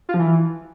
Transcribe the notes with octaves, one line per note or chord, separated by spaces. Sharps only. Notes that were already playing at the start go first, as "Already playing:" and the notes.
F4
F3
E3